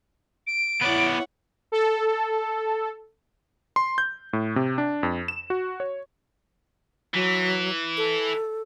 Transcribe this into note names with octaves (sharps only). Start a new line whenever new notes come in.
D7
B3 E4 C#5 D5 F#5
A4
C6
G6
A2
C3
D4
F2
E7
F#4
C#5
E3 F#3
A4